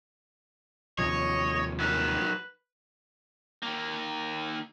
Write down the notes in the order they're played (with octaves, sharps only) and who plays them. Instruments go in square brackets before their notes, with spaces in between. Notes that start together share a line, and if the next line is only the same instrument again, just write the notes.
[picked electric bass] D#2 C3 F3 [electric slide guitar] C#5 [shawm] D#5
[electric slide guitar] F#3 D#4 A#4 [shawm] B4
[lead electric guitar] D#3 A#3